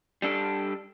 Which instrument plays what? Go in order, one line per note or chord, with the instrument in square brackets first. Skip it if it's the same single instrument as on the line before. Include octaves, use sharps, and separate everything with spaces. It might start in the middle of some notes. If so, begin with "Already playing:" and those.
[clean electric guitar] G3 D4 A4